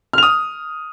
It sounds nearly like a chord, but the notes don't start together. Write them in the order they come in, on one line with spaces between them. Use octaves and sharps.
F6 F7 D#6